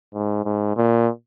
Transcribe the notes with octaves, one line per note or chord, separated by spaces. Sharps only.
G#2
G#2
A#2